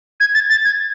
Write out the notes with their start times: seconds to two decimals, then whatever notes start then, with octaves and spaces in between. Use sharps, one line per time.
0.20 G#6
0.34 A6
0.49 A6
0.64 G#6